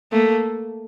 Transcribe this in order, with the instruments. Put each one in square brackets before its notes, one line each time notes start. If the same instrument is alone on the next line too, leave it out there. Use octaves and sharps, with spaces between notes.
[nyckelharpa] A3 [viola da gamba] A#3